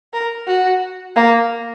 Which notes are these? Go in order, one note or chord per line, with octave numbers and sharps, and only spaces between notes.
A#4
F#4
A#3